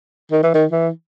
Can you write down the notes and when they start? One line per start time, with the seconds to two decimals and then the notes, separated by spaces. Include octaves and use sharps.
0.31 D#3
0.43 E3
0.54 D#3
0.71 E3